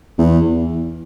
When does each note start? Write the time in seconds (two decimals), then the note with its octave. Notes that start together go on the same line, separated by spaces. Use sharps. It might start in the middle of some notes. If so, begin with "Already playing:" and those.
0.18 E2